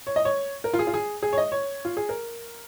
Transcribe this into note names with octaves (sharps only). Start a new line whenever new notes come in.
C#5
D#5
C#5
A#4
F4
G#4
F4
G#4
G#4
C#5
D#5
C#5
F4
G#4
A#4